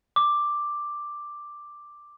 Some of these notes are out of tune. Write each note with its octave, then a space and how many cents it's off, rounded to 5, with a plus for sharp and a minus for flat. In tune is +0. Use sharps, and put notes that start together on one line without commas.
D6 +5